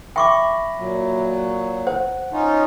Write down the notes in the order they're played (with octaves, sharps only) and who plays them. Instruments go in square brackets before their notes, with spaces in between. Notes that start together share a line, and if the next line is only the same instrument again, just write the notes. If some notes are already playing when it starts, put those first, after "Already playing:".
[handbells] E5 B5 A#6 [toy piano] G5 C#6 D6
[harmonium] A#2 F#3
[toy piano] C5 [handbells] F#5
[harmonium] C#4 D#4 F4